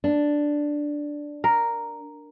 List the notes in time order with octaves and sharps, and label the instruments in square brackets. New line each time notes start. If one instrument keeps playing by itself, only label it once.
[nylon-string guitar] D4
[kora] A#4